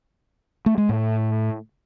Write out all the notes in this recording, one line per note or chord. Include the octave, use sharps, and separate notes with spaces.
A3
G#3
A2